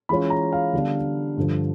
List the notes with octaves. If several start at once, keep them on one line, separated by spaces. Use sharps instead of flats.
E3 G#3 C#4 F4 B5
A#5
F5
D3 G3 B3 D4
G2 D3 F3